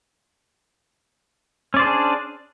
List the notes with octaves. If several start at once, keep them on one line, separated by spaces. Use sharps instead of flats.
C#4 D4 G#4 C5 D5